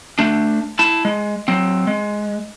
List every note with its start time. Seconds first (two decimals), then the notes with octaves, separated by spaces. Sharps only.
0.19 A3 D4
0.79 E4 A5
1.05 G#3
1.48 F#3 C4
1.87 G#3